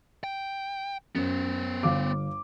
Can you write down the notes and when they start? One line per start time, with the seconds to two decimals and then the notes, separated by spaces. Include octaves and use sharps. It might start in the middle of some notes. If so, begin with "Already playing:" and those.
0.24 G5
1.15 F#2 B3 C5
1.83 G1 F5 D6